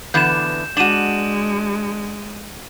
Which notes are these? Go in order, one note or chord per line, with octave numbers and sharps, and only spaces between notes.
D3 E3 B3 G6 E7
G#3 D4 F#4 D#7 E7 F#7